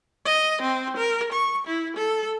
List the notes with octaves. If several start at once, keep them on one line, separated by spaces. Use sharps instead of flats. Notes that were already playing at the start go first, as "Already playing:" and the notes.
D#5
C4
A#4
C#6
E4
A4